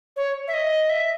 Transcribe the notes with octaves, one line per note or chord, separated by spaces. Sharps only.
C#5
E5
D#5
E5